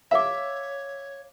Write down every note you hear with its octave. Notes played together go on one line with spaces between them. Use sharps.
C#5 E5 F5 D6